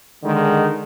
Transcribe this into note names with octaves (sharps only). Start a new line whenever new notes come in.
D3 D#3 G#3